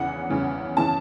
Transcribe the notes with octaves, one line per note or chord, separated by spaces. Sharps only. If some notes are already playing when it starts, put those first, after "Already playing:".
Already playing: E2 C#3 E3 F#5
E2 C#3 E3
C#3 E3 A5